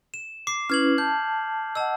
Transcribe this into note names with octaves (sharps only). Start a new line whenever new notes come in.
E7
D6 C7
C#4 E4 B4 F6 G#6 F#7
A5 G6
D#5 F#5 A5 E6